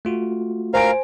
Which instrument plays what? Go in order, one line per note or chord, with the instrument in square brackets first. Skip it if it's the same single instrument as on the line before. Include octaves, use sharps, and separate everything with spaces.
[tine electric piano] A3 F4 F#4
[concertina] A#4 F5 [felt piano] C5 G#5 D7